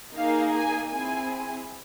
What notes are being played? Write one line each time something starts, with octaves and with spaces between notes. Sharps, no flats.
A#3 D#4 G#4 F5
G#5
C4 E4 G#4 G#5